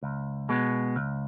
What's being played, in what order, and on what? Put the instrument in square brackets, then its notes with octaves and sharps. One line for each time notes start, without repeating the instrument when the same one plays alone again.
[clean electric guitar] C#2
B2 G#3 B3
C#2